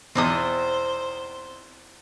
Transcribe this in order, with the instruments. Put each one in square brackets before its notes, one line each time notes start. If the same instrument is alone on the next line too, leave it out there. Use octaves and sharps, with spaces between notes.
[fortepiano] E2 B2 [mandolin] C4 D#4 D#6 [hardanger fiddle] C5